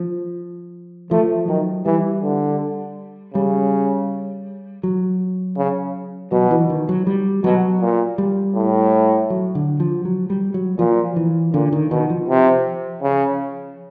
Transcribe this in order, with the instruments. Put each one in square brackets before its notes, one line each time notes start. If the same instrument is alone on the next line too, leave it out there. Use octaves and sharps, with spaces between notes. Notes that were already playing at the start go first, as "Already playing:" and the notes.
Already playing: [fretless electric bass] F3
[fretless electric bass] F3 [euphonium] A3
[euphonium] D#3 [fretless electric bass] F#3
[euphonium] E3 [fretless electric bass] G3
[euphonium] D3
[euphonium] C#3 [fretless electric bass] G3
[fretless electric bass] F#3
[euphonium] C#3
[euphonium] B2 [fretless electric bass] F#3
[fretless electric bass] E3
D#3
F#3
G3
[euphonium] B2 [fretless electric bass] F#3
[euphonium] A#2
[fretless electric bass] G3
[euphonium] A2
[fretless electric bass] F#3
D3
F3
F#3
G3
F#3
[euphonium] A#2 [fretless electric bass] F3
[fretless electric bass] E3
[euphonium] A#2 [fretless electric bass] D3
[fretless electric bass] D#3
[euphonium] B2 [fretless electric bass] D#3
[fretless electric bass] F3
[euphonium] C3
C#3